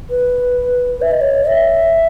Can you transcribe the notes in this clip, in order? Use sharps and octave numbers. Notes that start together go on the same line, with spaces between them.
B4
E5
D#5
C#5
E5